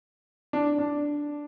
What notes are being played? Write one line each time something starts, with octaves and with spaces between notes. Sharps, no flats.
D4
D4